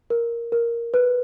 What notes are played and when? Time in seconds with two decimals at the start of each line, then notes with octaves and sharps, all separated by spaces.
0.10 A#4
0.52 A#4
0.94 B4